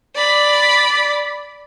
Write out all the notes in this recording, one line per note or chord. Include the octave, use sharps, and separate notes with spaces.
D5 B5